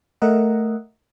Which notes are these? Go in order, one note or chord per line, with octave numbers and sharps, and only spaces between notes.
A3 A#4 D#5 E5 F#5